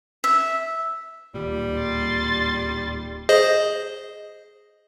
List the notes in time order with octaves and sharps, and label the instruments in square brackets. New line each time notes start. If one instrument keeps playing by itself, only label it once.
[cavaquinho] E5
[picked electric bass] D1 D#2 A#2 [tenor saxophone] G3
[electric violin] C6 A6
[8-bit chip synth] G#4 C5 D#5